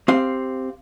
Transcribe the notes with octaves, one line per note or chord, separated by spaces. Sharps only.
C4 G4 F5